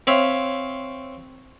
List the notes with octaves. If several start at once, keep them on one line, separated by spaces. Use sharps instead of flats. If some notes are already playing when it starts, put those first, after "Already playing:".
C4 C#5 E5 F5